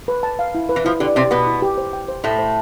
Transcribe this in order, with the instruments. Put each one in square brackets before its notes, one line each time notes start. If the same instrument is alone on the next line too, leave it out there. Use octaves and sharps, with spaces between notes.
[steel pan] B4
A5
F5
E4
B4
[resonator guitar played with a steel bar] E3
[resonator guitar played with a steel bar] F3 [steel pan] E4
[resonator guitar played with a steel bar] D3 [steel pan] G4
[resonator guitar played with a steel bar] C3 C4 [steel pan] D5
[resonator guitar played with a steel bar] B2 B3 [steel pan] B4
[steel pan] E4
G4
C5
G5
C5
[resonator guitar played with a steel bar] A2 A3 [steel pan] C6
[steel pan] C5